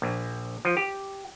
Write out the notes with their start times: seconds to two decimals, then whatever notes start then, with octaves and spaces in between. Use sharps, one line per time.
0.02 A#1
0.65 F3
0.77 G4